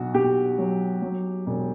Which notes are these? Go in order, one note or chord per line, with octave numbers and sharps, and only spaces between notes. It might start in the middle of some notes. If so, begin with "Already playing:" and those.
Already playing: B1 F#4
B1 G4
F#3
F#3
E1